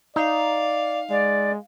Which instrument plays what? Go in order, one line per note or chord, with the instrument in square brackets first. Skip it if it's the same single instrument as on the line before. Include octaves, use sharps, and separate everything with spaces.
[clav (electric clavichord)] D#4 [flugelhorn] D5 [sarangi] F5
[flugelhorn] G#3 [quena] D5